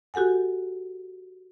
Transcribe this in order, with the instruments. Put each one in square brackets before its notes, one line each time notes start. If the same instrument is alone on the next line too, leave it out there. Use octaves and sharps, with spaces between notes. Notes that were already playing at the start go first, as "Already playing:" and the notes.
[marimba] F#4 G4 A4 F#5 G#5